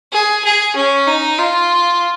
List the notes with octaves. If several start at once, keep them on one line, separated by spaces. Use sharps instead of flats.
G#4
G#4
C#4
D#4
F4